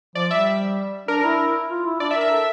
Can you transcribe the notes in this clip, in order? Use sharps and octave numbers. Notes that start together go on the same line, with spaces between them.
F3 D5
G3 E5
D4 A#4
E4
F4
E4
D4 D5
E5
A#4
E5
A4